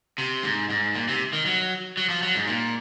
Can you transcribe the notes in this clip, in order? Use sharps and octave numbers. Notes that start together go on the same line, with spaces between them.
C3
G#2
G#2
A#2
C3
D#3
F#3
F#3
F3
F#3
G#2
A#2